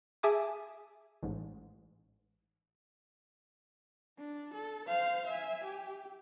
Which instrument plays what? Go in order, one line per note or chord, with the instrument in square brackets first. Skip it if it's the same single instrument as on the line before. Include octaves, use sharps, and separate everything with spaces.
[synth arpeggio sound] G#4 E5 G#5 A5 D6 D#6
A1 G#2
[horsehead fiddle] D4
A4
C5 F5
E5 G#5
G4